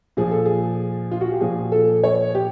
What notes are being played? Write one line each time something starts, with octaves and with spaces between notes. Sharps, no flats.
A#2 F3 G#4
A4
G#4
F4
F#4
G4
A#2 F3 G#4
A4
C#5
G4